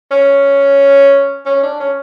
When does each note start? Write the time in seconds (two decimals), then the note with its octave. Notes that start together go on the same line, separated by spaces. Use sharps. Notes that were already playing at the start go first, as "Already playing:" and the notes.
0.11 C#4
1.46 C#4
1.63 D4
1.80 C#4